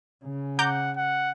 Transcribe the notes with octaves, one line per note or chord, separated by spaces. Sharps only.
C#3
F#5 A#5 D6 G6
F#5